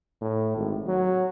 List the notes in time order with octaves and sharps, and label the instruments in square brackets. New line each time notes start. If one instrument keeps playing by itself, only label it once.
[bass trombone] A2
G#1
F#3